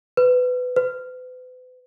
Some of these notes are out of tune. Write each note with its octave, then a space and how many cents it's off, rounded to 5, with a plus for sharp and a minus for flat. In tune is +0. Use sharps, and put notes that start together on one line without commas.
B4 +20
B4 +40